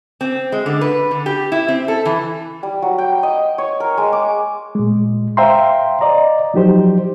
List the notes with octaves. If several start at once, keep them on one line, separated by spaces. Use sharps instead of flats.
C4
G#3
D3
B4
D3
G4
E4
C4
A4
E3
G3
F#3
G5
D#5
C#5
A#4
G#3
D6
A#2 G#3
C5 E5 F5 G5 A#5 C6
D5 D#5 A#5
F3 F#3 D#4 G4 C5